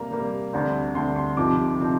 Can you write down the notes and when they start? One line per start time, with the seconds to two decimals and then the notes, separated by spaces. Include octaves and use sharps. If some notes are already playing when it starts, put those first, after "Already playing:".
Already playing: C3 G3 A#3 A#5
0.11 C3 G3 A#3
0.53 D2 D3 G3 C4
0.95 D2 D3 G3 C4 C6
1.16 C6
1.37 C2 C3 F3 C4 D#4 D6
1.80 C3 F3 C4 D#4